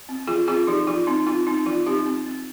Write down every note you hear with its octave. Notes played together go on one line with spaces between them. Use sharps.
C4
F3 F4 G#4
C4 F4 G#4
F3 D#4 G4
F3 F4
C4 D#4
C4 F4
C4 D#4
F3 F4
C4 D#4 G4
C4
C4